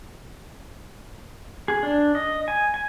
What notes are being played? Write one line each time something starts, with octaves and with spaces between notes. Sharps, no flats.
G#4
D4
D#5
G#5
G#5